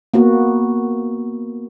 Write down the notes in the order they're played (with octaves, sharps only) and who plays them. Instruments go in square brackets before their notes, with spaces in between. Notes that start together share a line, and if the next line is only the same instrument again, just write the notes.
[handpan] A#3 B3 F#4